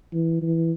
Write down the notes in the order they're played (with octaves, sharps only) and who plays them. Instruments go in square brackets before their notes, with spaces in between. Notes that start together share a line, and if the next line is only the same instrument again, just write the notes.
[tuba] E3
E3